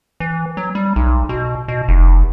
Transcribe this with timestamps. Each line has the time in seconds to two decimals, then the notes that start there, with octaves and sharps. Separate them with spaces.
0.20 E3
0.57 F#3
0.75 G3
0.96 B1
1.29 B2
1.68 B2
1.88 F1